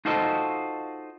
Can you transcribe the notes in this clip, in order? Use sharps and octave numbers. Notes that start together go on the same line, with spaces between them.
D#4 F4 F#4 A4 C5 D#5